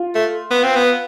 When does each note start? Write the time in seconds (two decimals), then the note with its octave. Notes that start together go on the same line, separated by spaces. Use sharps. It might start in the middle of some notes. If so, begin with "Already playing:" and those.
Already playing: F4
0.15 A3
0.51 B3
0.63 C4
0.76 B3